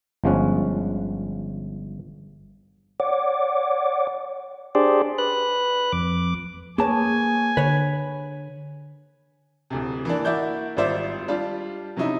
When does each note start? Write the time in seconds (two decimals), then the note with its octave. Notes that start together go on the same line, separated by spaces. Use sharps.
0.24 G1 F3 G#3 C#4 F#5
3.00 C#5 D5 F#5 D6
4.75 D4 G4 G#4 C5 D5
5.18 B4 F#6
5.92 F2 D6
6.78 A#3 G#4 B4 C#5 G#5 A5
7.57 D3 B4 C#5
9.70 D1 D2 C3
10.05 E3 A#3 D4
10.25 A#3 E4 F#4 D5 G6
10.77 G#1 G3 F4 C5 D5 E5
11.28 G3 D4 F4 G4
11.96 C3 F#3 C#4 D#4 E4